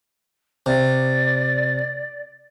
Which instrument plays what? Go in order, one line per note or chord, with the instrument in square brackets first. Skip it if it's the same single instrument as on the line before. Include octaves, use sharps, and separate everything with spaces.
[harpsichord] C3 [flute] D5